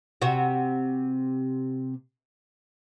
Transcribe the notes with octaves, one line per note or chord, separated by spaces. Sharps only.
C3 C4 F#4